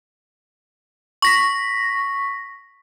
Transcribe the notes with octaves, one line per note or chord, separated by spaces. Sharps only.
C#6 A#6 B6